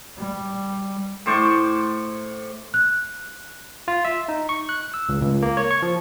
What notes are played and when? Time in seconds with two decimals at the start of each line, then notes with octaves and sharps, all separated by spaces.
0.18 G3
1.26 A2 C5 D5 C#6
2.74 F#6
3.88 F4
4.05 E5
4.29 D#4
4.49 C#6
4.69 F#6
4.94 E6
5.09 C#2
5.22 C#2
5.42 A#3
5.57 C#5
5.71 C#6
5.82 F3